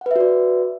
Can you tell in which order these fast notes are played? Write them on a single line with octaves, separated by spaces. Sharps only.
F#5 B4 E5 F#4 D5